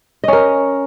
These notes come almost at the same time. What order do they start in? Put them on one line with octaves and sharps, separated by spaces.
D#5 C#4 A#4